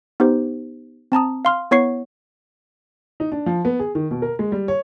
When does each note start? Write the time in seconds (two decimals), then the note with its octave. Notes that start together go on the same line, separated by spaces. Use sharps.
0.20 B3 D#4 G4 C5
1.12 C4 A5 A#5 D#6
1.45 F5 C6 F6
1.71 B3 E4 C#5 F#5 C#6 C7
3.20 D#4
3.32 D4
3.46 F3
3.65 B3
3.80 G#4
3.95 D#3
4.11 B2
4.22 A#4
4.39 G#3
4.52 G3
4.68 C#5